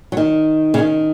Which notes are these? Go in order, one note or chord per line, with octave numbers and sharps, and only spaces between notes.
F#3
D#3
C#3
D#3